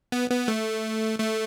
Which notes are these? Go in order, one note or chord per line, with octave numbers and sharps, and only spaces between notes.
B3
B3
A3
A3